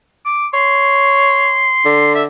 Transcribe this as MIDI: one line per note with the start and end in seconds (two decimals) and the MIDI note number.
0.25 0.47 86
0.54 1.74 73
0.54 2.15 84
1.85 2.26 50
2.15 2.23 76